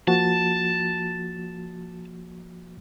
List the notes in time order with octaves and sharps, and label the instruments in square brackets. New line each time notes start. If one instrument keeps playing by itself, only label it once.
[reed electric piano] F3 A#3 F#4 [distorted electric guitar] A5